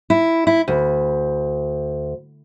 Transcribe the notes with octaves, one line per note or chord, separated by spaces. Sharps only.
E4
E4
D2